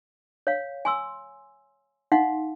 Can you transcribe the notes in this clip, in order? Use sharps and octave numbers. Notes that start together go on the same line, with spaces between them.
C#5 F5
G#5 C6 E6
D#4 F5 F#5 C6